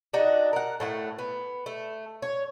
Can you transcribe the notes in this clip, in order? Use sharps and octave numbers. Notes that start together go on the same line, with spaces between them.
D4 D#4 F#4 D#5
A#4 F#5
A2 A3 F#5
B3
A3
C#5